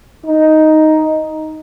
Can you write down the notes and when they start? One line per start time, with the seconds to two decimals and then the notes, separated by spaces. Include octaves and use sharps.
0.26 D#4